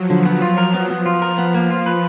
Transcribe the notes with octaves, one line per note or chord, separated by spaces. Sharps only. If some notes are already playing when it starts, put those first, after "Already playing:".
Already playing: F3 F#3
D3
B3
F4
A#4
B3
B3
F4
A#4
B3
F3 A#3
F4
B4